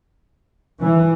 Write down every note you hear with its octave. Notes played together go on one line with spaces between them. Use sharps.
E3